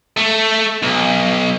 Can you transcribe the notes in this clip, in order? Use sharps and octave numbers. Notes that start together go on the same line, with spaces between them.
A3
B1